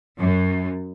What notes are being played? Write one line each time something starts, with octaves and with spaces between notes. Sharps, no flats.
F#2